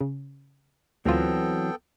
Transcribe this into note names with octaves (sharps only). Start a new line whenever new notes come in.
C#3
D2 E3 F#3 B3 C4 F4 A4 G5